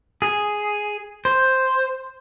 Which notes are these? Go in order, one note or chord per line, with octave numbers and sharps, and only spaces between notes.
G#4
C5